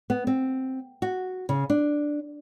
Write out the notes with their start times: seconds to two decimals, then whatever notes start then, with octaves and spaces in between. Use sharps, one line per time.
0.10 B3
0.27 C4
1.02 F#4
1.49 C#3
1.70 D4